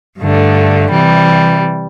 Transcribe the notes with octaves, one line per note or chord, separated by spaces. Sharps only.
G2 D3 A3
C3 E3 G3